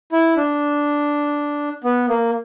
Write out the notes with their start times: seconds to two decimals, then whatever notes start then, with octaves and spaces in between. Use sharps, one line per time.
0.12 E4
0.37 D4
1.84 B3
2.09 A#3